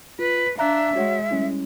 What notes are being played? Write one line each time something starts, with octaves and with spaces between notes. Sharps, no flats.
F4 B4
D4 E5 F5 A#5 F#6
G#3 F#4 C#5 F#5
G3 C#4 E4